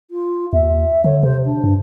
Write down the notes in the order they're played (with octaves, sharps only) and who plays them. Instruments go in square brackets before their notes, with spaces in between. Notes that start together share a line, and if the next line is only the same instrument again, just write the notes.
[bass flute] F4
[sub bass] D#2 [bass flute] E5
[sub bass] D3 [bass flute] C#5
[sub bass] C3 [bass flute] C5
[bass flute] D4
[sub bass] G2